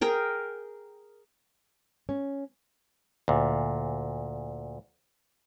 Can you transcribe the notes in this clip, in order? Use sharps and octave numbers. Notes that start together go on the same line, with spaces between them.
G#4 A#4 G5
C#4
D2 A#2